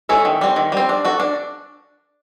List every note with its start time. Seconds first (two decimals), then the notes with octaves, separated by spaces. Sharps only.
0.09 G#3 C#4 E4 A4
0.25 D#3
0.41 G3 C4
0.56 D#3
0.72 G3 C4
0.89 D4
1.05 F#4 A4
1.20 D4